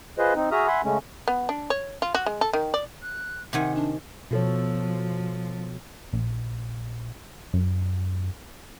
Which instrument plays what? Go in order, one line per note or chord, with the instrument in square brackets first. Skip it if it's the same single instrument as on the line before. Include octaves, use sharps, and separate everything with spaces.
[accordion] F4 G#4 B4 C5 D#5
C4 D#4
F#4 G#4 E5 A#5 D#6 F6
E5 F#5 G#5 B5 C6
C#3 G#3 A3 C#4
[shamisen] B3
D4
C#5
F4
F#4
G#3
A4
D#3
D5
[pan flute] F#6
[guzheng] C3 D#3 G#5 [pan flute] F#5
[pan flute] D4
[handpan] B2 A4 C#5 [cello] F3
[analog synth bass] A#1
F#2